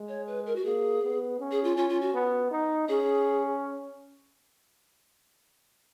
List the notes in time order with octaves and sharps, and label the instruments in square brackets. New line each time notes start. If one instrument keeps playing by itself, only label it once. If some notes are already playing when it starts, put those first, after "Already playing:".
Already playing: [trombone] G#3
[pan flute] C#5
B4
A#4
F#4
[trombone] A#3 [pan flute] G#4
[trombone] B3
C#4
[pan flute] G#4
F4
[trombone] C#4 [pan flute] F4
[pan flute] F4
F#4
[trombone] B3
D#4
[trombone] C#4 [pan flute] G#4